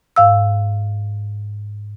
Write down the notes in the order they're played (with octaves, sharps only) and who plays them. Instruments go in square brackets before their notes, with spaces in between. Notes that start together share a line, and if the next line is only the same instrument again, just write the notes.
[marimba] G#2 F5 E6